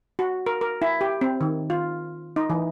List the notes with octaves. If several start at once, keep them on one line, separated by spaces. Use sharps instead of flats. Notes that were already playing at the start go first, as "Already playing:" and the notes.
F#4
A#4
A#4
E4
G4
C4
D#3
F4
D#4
E3